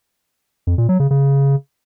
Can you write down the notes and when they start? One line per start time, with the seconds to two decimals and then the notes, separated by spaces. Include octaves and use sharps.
0.67 F2
0.78 A#2
0.89 F#3
1.00 C#3
1.11 C#3